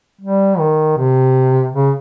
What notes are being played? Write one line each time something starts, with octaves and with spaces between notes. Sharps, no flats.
G3
D#3
C3
C#3